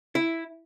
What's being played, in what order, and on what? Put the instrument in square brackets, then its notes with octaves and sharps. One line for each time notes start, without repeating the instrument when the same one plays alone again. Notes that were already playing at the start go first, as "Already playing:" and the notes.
[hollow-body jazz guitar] E4